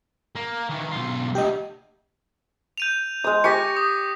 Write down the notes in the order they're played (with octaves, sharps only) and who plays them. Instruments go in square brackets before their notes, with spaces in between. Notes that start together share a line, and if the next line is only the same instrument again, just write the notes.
[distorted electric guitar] A#3
D#3 E3
B1 F4
[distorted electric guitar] D2 [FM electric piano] G4 D#5
[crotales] G6 D#7 F7
[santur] G#3 D#6
[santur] G4 G#5 C#6 [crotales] A#6 B6 C#7
[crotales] D#6